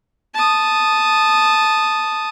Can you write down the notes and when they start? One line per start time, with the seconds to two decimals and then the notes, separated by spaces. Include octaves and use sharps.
0.35 A5 D#6